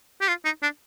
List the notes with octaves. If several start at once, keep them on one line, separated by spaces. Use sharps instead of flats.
G4
F4
D#4
D4